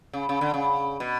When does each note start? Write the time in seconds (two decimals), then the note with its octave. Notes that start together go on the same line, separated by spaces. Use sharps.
0.13 C#3
0.29 C#3
0.41 D3
0.54 C#3
1.00 B2